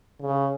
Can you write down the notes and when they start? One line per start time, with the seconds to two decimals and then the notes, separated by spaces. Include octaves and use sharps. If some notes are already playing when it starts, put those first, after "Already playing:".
0.22 C#3